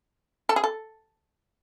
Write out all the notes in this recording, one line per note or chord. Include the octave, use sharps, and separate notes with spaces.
A4
G#4
A4